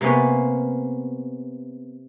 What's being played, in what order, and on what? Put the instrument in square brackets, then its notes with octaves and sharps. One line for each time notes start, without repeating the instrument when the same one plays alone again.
[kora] C3 A#3 B3 C#4